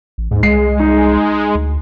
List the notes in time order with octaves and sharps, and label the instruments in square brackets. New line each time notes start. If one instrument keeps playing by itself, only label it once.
[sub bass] A1
[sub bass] D#2 [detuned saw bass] G#2
[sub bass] C2 [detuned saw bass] G#3 [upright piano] C7
[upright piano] D#4
[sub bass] D2